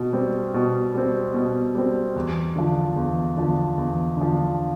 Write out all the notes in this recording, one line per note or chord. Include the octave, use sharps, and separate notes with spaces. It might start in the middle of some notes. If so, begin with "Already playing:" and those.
Already playing: B2
G3 C4
B2
G3 C4
B2
G3 C4
E2
D3 F3
E2
D3 F3
E2
D3 F3